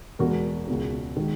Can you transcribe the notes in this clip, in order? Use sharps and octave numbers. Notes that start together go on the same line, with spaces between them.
E2 B2 G#3 F#4 A#4
C#2 B2 G#3
D#3 G#3